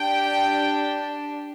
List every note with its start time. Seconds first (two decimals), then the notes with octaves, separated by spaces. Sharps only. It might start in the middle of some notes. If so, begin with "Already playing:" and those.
Already playing: D4 G4 G5